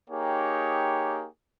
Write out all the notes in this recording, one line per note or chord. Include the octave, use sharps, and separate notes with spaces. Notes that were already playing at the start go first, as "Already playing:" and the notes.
A#3 D#4 G4 G#4 C#5 G5